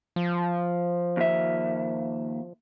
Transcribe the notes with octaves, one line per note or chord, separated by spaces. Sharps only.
F3
D#2 E5